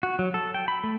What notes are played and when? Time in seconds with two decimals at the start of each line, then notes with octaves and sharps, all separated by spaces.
0.03 F#4
0.19 F#3
0.34 A4
0.54 G5
0.68 B5
0.84 A3